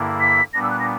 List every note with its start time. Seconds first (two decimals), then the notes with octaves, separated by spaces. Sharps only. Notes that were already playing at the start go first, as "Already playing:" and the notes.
Already playing: G2 D3 A#3 E4
0.20 B6
0.54 A#2 G3 B3 D4 A#6
0.63 E6
0.71 F#6
0.80 A#6